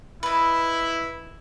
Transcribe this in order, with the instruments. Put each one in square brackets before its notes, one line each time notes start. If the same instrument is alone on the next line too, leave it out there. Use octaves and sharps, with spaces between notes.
[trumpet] E4 [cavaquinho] B4 D#5